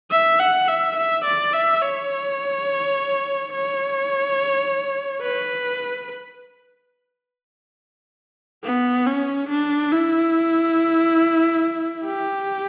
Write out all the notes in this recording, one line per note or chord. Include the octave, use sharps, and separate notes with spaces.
E5
F#5
E5
E5
D5
E5
C#5
C#5
B4
B3
C#4
D4
E4
G4